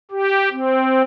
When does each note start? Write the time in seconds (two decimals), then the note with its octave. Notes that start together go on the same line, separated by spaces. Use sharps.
0.11 G4
0.51 C4